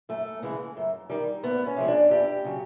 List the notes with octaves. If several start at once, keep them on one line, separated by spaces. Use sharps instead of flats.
F#2 A3
C#3 E3 G#3
F#2
D#3 G3
D2 B3
C#4
C3 F3 G#3
D4
E2 G4
C#3 F#3